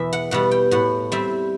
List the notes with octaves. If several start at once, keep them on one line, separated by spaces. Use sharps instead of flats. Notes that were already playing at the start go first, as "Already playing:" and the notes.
Already playing: E2 B2 E5
F#5
B2 G3 F#5
G5
A2 F#5
G3 C4 E5